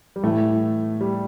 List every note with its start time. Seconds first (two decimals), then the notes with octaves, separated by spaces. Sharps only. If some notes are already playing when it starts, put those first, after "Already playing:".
0.16 G3
0.23 A2 E3 A3
1.01 G3